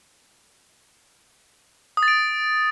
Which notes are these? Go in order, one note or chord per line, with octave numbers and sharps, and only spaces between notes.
D#6
A6
D7